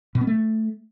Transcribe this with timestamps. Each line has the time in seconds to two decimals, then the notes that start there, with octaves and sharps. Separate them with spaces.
0.15 B2
0.21 B3
0.27 A3